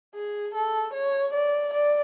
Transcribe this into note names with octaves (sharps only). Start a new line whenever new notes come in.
G#4
A4
C#5
D5
D5